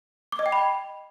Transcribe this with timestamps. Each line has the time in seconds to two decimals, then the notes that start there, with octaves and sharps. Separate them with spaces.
0.32 D6
0.39 D#5
0.46 G5
0.52 B5